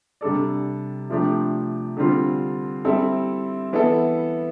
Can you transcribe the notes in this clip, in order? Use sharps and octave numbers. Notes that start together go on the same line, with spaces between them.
C3 G3 D4 A4 D5
C3 F3 A3 D4 G4
D3 G3 C4 F4
G3 C4 E4 A4
E3 B3 E4 A4